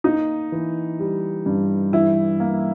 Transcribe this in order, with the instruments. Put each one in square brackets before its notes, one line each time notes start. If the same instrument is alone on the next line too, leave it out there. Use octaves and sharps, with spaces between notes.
[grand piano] A#3 [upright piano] D#4
[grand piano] E3
G3
G2
[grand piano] E3 [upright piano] E4
[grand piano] A#3